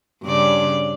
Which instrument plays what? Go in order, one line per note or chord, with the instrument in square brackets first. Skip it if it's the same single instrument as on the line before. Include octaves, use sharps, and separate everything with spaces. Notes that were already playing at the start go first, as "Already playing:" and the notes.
[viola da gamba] G2 C#3 D5